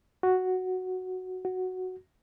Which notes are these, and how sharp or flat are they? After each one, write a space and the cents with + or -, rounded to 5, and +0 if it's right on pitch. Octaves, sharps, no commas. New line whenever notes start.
F#4 +0
F#4 +0